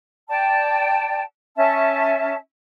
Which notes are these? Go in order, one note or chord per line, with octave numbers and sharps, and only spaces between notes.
D5 G5 A5
C#4 E5 A5